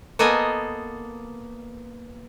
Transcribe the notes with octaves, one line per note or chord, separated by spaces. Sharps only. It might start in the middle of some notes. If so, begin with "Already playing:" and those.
A#3 B3 A4 D#5 G#5